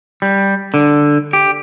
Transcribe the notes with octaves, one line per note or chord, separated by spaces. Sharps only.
G3
D3
G4